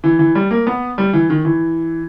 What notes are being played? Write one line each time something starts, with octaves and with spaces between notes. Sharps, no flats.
E3
E3
G3
A#3
B3
G3
E3
D#3
E3